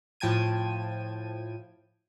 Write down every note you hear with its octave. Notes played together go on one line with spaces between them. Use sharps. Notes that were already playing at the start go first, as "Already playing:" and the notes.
A2 F3 G5 A5 G#6 D#7